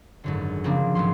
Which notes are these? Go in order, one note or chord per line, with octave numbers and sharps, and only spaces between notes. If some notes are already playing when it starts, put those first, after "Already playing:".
G#1 F#2 D3
C#3 F3 A#3 C4 D4
G#1 E2 F#3 C6